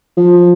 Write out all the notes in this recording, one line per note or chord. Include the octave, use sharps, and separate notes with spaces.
F3